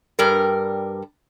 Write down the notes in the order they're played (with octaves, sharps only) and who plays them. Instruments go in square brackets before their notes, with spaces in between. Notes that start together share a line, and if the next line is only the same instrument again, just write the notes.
[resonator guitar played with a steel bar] G2 G3 A#4